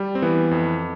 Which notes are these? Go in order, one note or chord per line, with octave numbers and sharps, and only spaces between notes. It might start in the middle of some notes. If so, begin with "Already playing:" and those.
Already playing: G3
C4
E3 B3
F2